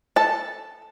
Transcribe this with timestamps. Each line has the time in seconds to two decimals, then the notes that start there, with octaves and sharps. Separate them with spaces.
0.16 A4 A5